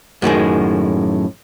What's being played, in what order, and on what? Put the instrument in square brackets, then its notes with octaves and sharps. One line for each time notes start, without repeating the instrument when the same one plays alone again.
[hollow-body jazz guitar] F#2 A2 D#3 G#3